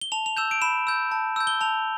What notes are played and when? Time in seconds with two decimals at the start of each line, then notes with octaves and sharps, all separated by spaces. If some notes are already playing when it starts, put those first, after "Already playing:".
0.01 G7
0.12 A5 F7
0.26 F7
0.37 E6 G6 E7
0.51 D7
0.62 B5 E7
0.87 E6 G6
1.12 A5
1.36 E6 G6
1.47 G7
1.61 A5 F7